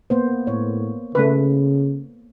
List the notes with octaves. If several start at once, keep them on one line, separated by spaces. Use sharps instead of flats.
A#3 B3 C5
A2 C#5
C#3 A3 B4